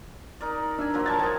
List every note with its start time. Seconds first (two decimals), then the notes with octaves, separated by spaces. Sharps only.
0.41 D#4 A#4 D5
0.78 D4 E5 G#5
0.94 F3 F#3 A#3
1.06 A5 G#6 A6
1.19 D#3 D#4